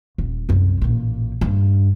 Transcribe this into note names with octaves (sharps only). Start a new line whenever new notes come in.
D#1
C2 F#2
A1 A#2
G2